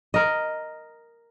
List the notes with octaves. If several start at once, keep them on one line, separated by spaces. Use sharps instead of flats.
A#4 D#5